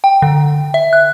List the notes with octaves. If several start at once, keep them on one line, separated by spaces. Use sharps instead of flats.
G5
D3
E5
F#6